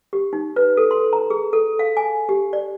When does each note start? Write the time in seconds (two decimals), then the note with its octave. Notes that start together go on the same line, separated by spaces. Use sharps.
0.13 G4
0.33 D#4
0.56 B4
0.77 A4
0.91 C6
1.13 A#5
1.30 G#4
1.53 A4
1.79 F5
1.97 G#5
2.29 G4
2.53 D5